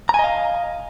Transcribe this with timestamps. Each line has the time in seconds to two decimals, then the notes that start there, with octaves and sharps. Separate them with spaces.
0.09 A#5
0.14 G#5
0.19 D#5
0.24 F5